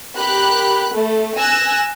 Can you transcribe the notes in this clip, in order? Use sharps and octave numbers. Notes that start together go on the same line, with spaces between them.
G4 A#4 B5 F#6
A3
G#5 E6 F#6 A#6